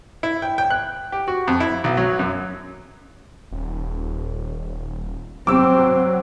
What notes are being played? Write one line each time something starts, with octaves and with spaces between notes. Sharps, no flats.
E4
G5
G5
F#6
G4
F#4
F2
E4
B1
F#3
F#2
D#1
F#3 C4 D6 E6